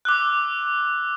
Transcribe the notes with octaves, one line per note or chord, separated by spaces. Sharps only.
D6 E6 F#6